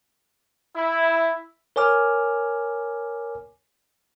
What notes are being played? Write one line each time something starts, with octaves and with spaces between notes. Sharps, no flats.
E4
A#4 C#5 G#5 D6 F6